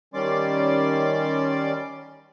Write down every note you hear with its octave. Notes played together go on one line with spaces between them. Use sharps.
D#3 G3 C#4 D5 C6 D6